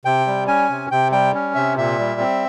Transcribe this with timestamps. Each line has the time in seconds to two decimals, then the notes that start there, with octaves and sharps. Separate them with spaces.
0.05 C3 G5
0.27 G3
0.47 C#4 G#5
0.70 C3
0.91 C3 G5
1.12 G3 G5
1.34 C#4
1.55 C3 E5
1.77 A#2 E5
1.99 G3
2.20 C4